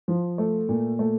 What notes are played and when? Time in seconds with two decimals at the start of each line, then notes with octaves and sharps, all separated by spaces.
0.08 F3
0.38 A3
0.69 A#2
0.99 A3